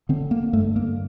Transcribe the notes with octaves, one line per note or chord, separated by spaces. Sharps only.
D3 C4
A#3
G2 A3
A#3